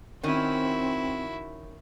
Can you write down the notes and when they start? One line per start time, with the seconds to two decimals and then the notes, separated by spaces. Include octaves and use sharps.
0.23 D#3 C4 C#4 E4 F#4